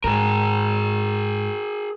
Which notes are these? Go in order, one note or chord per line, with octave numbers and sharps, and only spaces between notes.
G#2 G#4 A#4